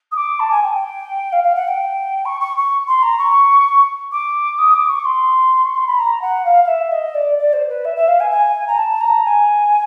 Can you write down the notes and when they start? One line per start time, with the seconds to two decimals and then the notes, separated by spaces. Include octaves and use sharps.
0.11 D#6
0.16 D6
0.39 A5
0.50 G#5
0.62 G5
0.74 G5
1.32 F5
1.43 F5
1.55 F#5
1.67 G5
2.25 C#6
2.40 C#6
2.57 C#6
2.87 C6
3.02 A#5
3.18 C#6
4.11 D6
4.58 D#6
4.74 D6
4.89 C#6
5.05 C6
5.65 C#6
5.76 C6
5.86 B5
5.97 A#5
6.21 F#5
6.45 F5
6.64 F5
6.67 E5
6.91 D#5
7.14 D5
7.38 D5
7.53 C5
7.68 B4
7.84 E5
7.95 E5
8.07 F5
8.20 G#5
8.31 G#5
8.67 A#5
8.77 A5
9.00 A#5
9.25 G#5